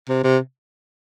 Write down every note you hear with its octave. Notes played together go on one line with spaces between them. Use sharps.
C3
C3